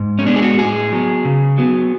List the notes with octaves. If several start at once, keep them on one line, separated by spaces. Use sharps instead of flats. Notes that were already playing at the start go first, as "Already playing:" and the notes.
Already playing: G#2
C#4
G#3 B3 D4
G#4
F#4
A2 G#4
F#3 B3
C#3
F#3 B3